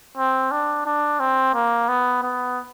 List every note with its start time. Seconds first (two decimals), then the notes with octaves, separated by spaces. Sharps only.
0.18 C4
0.52 D4
0.86 D4
1.20 C4
1.54 A#3
1.89 B3
2.23 B3